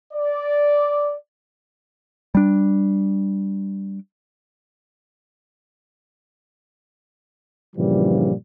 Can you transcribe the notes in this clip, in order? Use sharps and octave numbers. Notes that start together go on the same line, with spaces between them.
D5
G3 D4
G2 A#2 C#3 E3 F3 G3